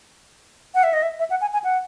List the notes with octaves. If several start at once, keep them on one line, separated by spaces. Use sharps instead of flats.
F#5
E5
D#5
E5
E5
F#5
G#5
G#5
F#5